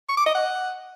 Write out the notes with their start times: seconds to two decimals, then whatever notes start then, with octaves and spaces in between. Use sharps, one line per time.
0.09 C#6
0.17 D6
0.26 D#5
0.34 F#5